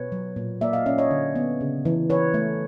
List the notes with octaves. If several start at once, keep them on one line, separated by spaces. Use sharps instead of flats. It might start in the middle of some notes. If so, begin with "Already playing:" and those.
Already playing: B2 B4 C#5
F#3
A#2
A#3 D5 E5
D#5 F5
C#4 D5 E5
C#5 D#5
D3
B3
C#3
E3
E3 B4 C#5
A3